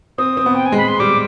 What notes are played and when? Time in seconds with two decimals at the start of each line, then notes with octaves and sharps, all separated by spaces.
0.18 C4 D#6
0.37 C4
0.46 B3
0.55 G5
0.66 G#5
0.72 G#3
0.77 B5
0.88 C6
1.00 G3 D6